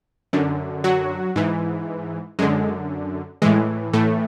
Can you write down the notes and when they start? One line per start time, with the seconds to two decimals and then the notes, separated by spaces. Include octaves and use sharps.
0.33 F#2 D3
0.84 F#3 F#4
1.36 G#2 E3
2.39 F#2 D3 G#3
3.42 A2 E3 G#3
3.93 A2 A3